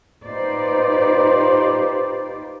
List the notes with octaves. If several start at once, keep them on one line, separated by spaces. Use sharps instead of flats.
D#4 F4 G4 B4 C5 D5